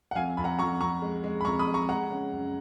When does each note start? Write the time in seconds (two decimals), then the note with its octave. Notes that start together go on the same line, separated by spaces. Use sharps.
0.11 F#5
0.15 F2 F5 G#5
0.37 F2 B5
0.44 F#5 A#5
0.59 F2 A#5 C#6
0.80 F2 A#5 C#6
1.02 G#3
1.24 G#3
1.41 B5
1.45 F2 A#5 C#6
1.59 B5 D#6
1.67 G#3
1.74 A#5 C#6
1.89 G#3 F#5 A#5
2.10 C#3
2.32 F#2